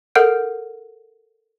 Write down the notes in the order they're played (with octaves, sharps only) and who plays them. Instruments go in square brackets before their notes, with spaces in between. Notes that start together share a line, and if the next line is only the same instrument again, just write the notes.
[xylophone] A4 A#4 F#5 F6 G6 D7